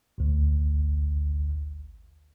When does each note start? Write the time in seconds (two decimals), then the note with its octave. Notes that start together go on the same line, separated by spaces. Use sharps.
0.18 G#1 D2